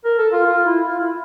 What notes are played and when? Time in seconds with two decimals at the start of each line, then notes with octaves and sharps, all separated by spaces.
0.05 A#4
0.18 A4
0.32 F4
0.46 F4
0.66 E4
0.86 F4
0.99 E4